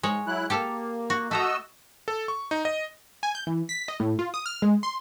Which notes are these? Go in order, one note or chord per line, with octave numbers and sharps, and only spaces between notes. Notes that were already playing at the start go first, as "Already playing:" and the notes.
G#2 G#3 C#5
F#3 E4 F#6
A#3 G4 A4 F5
F#4
A3 F#4 A4 D#5 A#5 E6
A4
C#6
D#4
D#5
G#5
G6
E3
B6
D#5
A2
F4
D#6
F6
G#3
C6